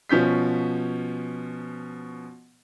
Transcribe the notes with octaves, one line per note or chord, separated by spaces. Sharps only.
B2 F3 C#4 G6 B6